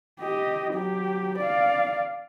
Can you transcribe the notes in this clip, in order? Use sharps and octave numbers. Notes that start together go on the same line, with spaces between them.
G4 D#5
F#3 G4
D5 F5